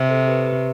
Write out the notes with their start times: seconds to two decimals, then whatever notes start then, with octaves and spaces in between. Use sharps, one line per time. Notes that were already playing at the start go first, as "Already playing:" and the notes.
Already playing: C3
0.09 A4 C5
0.28 G4 B4
0.47 G4 B4